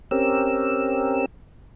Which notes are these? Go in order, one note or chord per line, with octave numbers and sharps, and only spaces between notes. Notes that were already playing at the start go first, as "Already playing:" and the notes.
C4 C#4 G4 A#4 E6